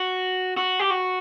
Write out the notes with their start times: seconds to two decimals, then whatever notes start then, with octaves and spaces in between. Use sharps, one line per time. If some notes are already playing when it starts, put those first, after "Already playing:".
Already playing: F#4
0.57 F#4
0.79 G4
0.90 F#4